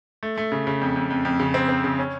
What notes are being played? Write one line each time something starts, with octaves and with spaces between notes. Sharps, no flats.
A3
A3
C#3
C#3
F2
F2
F2
F2
C#3
C4
C4
C#3
C#4